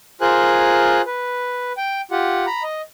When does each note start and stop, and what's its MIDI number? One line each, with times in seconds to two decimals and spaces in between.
0.21 1.02 65
0.21 1.02 68
0.21 1.02 70
0.21 1.02 72
0.21 1.02 80
0.21 1.02 90
1.06 1.72 71
1.77 2.01 79
2.11 2.46 65
2.11 2.46 67
2.11 2.46 78
2.47 2.63 82
2.47 2.63 83
2.63 2.82 75